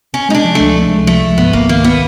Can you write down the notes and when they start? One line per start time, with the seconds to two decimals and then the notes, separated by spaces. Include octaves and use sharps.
0.14 C3 C#4
0.29 G#3 D#4
0.35 D4
0.45 F3
0.55 C#2 A3
0.75 C3
0.91 G#3
1.07 F3 A3
1.22 C#2
1.38 G#2 B3
1.53 G#1 A#3
1.69 D#3 A#3
1.85 B3